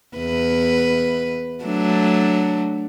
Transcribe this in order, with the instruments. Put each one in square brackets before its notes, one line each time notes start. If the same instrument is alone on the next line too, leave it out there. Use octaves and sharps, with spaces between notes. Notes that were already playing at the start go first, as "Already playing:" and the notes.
[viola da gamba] E2 B4
F#3 A3 D4